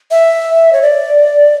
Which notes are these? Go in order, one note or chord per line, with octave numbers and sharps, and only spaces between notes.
E5
C#5
D5